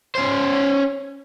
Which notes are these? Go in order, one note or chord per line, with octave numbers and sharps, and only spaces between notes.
C#4 C5